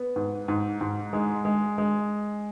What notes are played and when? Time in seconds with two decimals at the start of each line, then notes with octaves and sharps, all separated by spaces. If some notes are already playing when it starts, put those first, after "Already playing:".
Already playing: B3
0.16 G#2
0.48 G#2
0.81 G#2
1.13 G#3
1.45 G#3
1.78 G#3